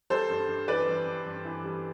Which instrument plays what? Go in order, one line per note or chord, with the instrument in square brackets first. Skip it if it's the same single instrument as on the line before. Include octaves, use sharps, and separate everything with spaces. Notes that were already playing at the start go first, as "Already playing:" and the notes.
[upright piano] G3 A4 C5
G2
G2
E3 B4 D5
G3
G2
G2
E3
G3